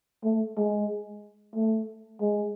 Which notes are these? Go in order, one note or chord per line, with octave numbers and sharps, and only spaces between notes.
A3
G#3
A3
G#3